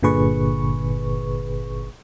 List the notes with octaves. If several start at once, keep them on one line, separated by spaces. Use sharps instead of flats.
G1 A#2 D3 G#4 B4 C#6